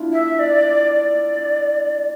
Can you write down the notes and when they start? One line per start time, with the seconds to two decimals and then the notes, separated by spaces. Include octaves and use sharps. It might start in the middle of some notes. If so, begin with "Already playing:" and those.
Already playing: D4 E4 F4
0.12 E5
0.39 D5
0.95 D5